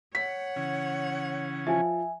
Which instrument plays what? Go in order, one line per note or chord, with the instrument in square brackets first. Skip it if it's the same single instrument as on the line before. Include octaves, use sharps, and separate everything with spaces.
[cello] C#5 F#5 [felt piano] B6
[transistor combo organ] C#3 E3 C#4
[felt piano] F3 [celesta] E5 G#5